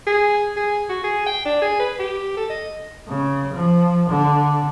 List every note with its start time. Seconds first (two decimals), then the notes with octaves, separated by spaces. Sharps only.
0.07 G#4
0.56 G#4
0.89 F#4
1.04 G#4
1.27 G5
1.45 D4
1.62 G#4
1.80 B4
1.99 G4
2.37 A4
2.49 D#5
3.08 C#3
3.54 F3
4.10 D3